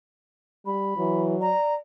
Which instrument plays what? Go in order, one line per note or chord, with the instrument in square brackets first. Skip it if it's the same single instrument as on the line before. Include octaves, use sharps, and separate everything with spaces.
[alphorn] G3 [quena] B5
[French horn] E3 [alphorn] F#3
[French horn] D5 [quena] A#5